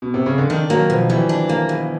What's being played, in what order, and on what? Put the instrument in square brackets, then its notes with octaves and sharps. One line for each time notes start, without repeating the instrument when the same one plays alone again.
[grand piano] B2
C3
C#3
D3
[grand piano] D#3 [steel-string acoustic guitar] D4
[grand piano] F#3 [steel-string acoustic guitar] A#3
[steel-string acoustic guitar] B2 [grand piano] F3
[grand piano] E3 [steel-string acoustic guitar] G3
[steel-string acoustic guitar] D4
A#3
B2